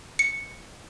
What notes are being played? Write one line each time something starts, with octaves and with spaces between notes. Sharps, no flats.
C#7